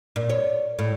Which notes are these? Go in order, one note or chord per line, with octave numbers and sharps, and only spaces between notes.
A#2
C#5
A2